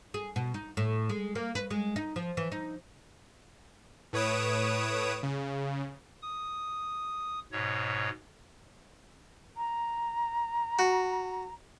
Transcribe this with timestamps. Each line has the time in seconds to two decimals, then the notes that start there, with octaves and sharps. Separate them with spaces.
0.14 G#4
0.36 B2
0.54 D#4
0.77 A2
1.10 G#3
1.35 A#3
1.55 B4
1.71 G#3
1.96 D#4
2.16 F3
2.37 E3
2.52 D#4
4.13 A2 B4 C#5 D#6 D7 E7
5.23 C#3
6.22 D#6
7.52 G#2 B2 C#5
9.57 A#5
10.79 F#4